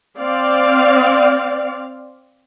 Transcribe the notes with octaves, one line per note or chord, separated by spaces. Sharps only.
C4 D5 F5